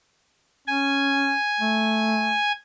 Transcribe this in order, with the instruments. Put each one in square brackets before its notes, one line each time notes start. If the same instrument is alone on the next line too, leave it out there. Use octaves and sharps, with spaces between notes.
[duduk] C#4 [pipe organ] G#5
[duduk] A3